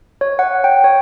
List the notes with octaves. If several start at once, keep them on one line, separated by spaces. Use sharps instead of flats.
C#5
F#5
G5
C#5